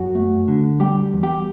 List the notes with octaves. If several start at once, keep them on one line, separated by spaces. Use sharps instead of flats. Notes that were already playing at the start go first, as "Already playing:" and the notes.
Already playing: F#2 F#4 F#5
A3
D3
G3 G4 G5
E2
G4 G5